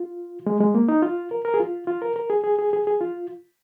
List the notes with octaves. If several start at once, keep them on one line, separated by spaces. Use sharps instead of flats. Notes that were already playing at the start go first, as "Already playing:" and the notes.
Already playing: F4
G#3
G#3
A#3
D#4
F4
A#4
A#4
G#4
F4
F4
A#4
A#4
G#4
G#4
G#4
G#4
G#4
F4